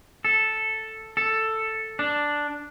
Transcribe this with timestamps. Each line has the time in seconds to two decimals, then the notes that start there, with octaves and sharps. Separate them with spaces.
0.25 A4
1.17 A4
1.99 D4